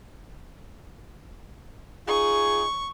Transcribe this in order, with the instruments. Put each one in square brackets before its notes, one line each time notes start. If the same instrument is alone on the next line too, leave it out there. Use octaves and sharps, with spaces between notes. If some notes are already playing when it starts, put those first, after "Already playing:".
[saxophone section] D#4 F4 G#4 [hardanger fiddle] C#6